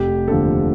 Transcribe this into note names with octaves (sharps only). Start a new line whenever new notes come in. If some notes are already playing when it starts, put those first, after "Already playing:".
Already playing: F1 G4
D#2 D3 F3 A4